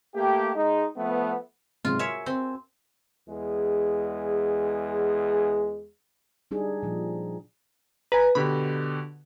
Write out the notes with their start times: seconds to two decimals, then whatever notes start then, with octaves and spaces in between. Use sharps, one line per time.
0.15 A3 A#3 G4
0.56 G#3 D#4
0.97 F3 A3 B3
1.85 G#2 C3 F#3 F4
1.99 F#4 A#4 C#5 E5 G#5
2.26 C4
3.28 E2 G#3 G#4
6.51 G3 D4 D#4 G#4
6.83 A#2 F3
8.12 B4 G#5 A#5
8.35 B2 D3 G4 B5